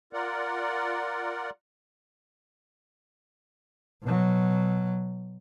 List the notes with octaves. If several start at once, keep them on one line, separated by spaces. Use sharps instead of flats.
F4 A#4 D5 F#5
B2 F#3